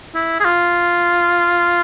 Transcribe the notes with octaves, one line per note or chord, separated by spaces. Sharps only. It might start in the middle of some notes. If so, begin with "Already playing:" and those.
E4
G#4
F4